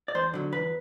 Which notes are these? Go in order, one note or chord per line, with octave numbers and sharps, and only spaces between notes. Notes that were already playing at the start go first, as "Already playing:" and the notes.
D5
E2 C5
D3 F#3
E2 B4